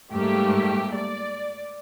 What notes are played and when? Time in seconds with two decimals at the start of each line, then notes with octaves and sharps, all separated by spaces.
0.13 G#2 G3 A3 A#3 G4
0.93 D5